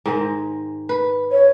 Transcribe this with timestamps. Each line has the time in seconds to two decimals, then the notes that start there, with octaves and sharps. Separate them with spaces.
0.06 G#2 D#3 G#3
0.89 B4
1.31 C#5